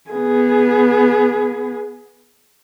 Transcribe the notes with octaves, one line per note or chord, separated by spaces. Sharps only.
B3 G#4